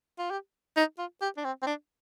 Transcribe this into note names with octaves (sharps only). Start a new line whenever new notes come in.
F4
G4
D#4
F4
G4
D4
C4
C4
D4